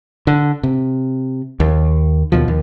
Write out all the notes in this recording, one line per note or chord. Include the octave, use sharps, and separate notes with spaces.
D3
C3
D#2
D#2 B2 F3
D#2